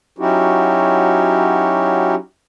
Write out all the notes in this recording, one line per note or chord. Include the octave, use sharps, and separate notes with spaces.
F#3 C#4 D#4 E4 F#4 G4